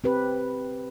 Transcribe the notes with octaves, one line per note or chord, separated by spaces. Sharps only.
C4 G4 B4